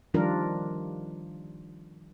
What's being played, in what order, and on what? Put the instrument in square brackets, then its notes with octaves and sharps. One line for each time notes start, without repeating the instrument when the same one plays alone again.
[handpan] D#3 F3 G3 D4 F4 A#4